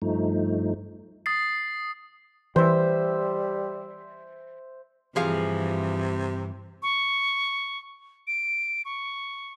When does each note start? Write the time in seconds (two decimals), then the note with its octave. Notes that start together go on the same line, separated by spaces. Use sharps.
0.02 G2 F3 A3 D#4
1.26 D#6 A6 C7
2.56 E3 G3 C5 E5
5.16 G2 C3 E3 F3 G#4 F5
6.83 C#6
8.27 D7
8.85 C#6